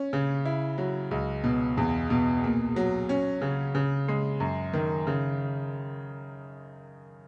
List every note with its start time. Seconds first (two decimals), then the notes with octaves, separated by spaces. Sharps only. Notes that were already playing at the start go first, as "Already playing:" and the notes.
Already playing: C#4
0.13 C#3
0.45 E4
0.78 F#3
1.11 C#2
1.44 B2
1.77 E2
2.10 B2
2.44 A#2
2.76 F#3
3.09 C#4
3.41 C#3
3.75 C#3
4.08 G#3
4.40 F#2
4.73 D#3
5.07 C#3